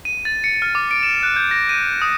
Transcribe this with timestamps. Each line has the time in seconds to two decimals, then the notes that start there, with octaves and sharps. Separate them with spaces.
0.05 D#7
0.25 A6
0.44 C#7
0.62 F6
0.75 D6
0.91 D7
1.03 E7
1.23 F#6
1.36 G6
1.51 A#6
1.69 D#7
2.02 D#6